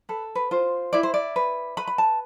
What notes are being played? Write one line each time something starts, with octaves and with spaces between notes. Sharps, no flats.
A4 B4
B4
F4 C5
E4 D5
C5
D5
B4
B4 B5
B5
A5